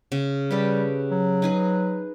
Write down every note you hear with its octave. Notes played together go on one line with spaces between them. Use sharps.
C#3
G3 G4 A4 B4
F#3
D#4 G#4 B4